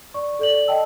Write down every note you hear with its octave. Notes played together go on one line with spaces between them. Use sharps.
D5 C#6
A4 D5 F#7
D#5 G5 A5 E6